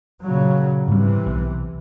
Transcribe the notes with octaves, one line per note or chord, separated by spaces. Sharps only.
A#2 C#3 F#3
G#2 C3 E3 G3
B1